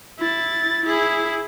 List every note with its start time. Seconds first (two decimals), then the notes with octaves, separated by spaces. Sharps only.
0.19 E4 A6
0.85 E4 G#4